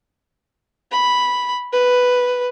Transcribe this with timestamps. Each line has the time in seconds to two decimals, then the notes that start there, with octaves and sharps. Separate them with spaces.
0.92 B5
1.73 B4